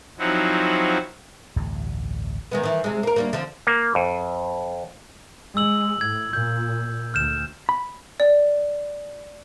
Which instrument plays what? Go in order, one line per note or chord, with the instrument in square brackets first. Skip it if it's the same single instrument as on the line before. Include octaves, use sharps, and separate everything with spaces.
[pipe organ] F3 F#3 C4 D#4 E4 F#4
[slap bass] A1 D2 G2 C3
[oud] D#3 G#3 B3
D#3 E3
C3 G#3
A#3 A#4
D2 G3 A#3
D3 F3 C4
[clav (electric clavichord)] A#3
F2
[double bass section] G#3 [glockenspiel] E6 F#7
[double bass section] A2 [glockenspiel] G#6
[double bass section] A#2 [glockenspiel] G6
[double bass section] D2 [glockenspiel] F6 G6 E7
[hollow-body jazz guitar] B5
[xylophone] D5